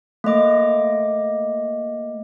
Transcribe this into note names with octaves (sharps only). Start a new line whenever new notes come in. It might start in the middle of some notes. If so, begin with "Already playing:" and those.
A3 A#3 D#5 D6